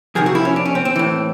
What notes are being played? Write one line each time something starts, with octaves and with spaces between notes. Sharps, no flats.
F2 C3 D#3 G#4
F#4
E4
C#4
D4
C#4
C4
C4
A2 E3